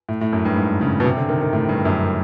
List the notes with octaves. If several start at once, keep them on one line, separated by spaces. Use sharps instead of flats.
A2
A2
F#2
G2
G#2
C#3
B2
C3
D3
D#3
D#3
A2
G2
F#2